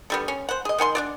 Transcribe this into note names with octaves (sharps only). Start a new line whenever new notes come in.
D3 G3 B3
C#4
C5 F#5
G#4 D#5
D#3 F#5 G#5 C6
D4 F#4 D5